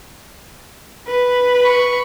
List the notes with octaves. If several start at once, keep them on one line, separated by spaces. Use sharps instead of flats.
B4
B5 C#6